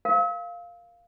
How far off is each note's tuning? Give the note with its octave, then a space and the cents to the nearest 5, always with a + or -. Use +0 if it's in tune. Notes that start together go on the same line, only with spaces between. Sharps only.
A#4 +0 F5 +0